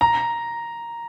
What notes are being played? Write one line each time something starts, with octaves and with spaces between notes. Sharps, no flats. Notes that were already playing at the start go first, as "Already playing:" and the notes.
A#5